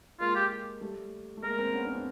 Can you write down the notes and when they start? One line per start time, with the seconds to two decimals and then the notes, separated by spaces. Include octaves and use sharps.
0.20 G#3 A#3 F4
0.35 G4
0.81 G3 A3
1.37 A3
1.43 G#3 A#3 A#4
1.58 A#3 C4
1.74 B3 C#4
1.85 C4 D4
1.95 C4 D4